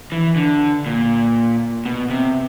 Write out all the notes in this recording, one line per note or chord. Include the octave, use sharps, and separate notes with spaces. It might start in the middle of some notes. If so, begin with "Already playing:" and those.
E3
D3
A#2
B2
C3